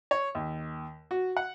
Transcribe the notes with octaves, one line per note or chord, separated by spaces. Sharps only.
C#5
D#2
F#4
F#5